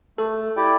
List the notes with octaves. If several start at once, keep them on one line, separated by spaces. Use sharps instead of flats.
A3 A4
E4 G4 D5 G5